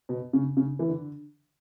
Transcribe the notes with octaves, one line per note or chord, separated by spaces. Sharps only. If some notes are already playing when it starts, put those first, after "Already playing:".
B2
C#3
C#3
E3
D3